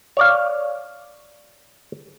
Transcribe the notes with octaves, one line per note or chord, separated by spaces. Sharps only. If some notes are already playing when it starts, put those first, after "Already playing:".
C#5 D5 F5